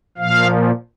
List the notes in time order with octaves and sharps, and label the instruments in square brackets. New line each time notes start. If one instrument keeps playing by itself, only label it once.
[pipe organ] A#2 F3 F5